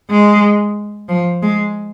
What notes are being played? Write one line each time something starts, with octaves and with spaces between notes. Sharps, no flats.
G#3
F3
G#3